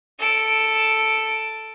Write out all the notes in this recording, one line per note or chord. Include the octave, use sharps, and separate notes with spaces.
A4 D7